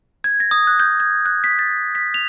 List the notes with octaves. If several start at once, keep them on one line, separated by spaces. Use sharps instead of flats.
G#6
A#6
D#6
F#6
G6
G#6
F#6
B6
A6
B6
F7